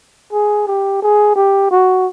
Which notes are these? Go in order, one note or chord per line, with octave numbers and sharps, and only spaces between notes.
G#4
G4
G#4
G4
F#4